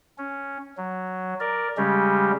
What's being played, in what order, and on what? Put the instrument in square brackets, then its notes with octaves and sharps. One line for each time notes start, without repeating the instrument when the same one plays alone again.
[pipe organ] C#4
F#3
A#4 D5
C#3 G3 G#3 C#4 G4